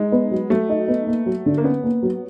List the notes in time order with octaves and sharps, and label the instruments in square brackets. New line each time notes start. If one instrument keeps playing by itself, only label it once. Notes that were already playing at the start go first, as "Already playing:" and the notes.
Already playing: [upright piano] G#3 [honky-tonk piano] D#4
[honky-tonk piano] B3
F#3
[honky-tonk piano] F#3 [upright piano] A3
[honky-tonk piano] D#4
B3
A#3
F#3
D3
[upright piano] A#3
[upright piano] B3 [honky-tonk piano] C#4
[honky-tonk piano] A#3
F#3